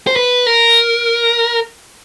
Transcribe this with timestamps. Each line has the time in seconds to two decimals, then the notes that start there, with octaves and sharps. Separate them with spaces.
0.07 C5
0.16 B4
0.46 A#4